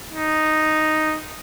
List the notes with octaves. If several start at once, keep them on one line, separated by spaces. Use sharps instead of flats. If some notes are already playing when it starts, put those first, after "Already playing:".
D#4